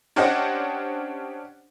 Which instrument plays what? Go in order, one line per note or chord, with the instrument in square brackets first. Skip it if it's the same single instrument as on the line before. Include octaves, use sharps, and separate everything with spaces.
[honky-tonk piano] C#4 D4 G4 C5 D#5 F#5